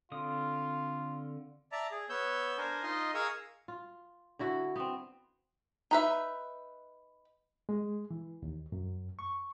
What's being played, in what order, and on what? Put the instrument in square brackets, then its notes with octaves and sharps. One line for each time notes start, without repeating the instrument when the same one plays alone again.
[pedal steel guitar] D3 C4 D#6 [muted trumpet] F4
[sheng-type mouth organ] D5 E5 A5 A#5
G#4
B3 C#5 E6 G6
D4 A#4 C5 G#5
D#4 F4 D#5 C6
G#4 A#4 F5 C#6 D#6 E6
[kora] F4
D3 E4 F#4
B3 C4
[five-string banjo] D#4 B4 E5
[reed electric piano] G#3
E3
D#2
F#2
C#6